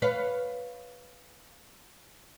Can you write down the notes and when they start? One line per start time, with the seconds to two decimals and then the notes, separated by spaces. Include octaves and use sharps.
0.02 B4 C#5 F5